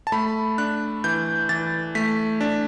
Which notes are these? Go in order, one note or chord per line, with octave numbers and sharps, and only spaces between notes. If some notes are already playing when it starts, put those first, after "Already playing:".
A5
A3 B5
D4 F#6
E3 G6
E3 A6
A3 B6
D4